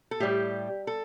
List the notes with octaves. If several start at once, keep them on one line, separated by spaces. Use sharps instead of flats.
A4
A2 G3 G4
A4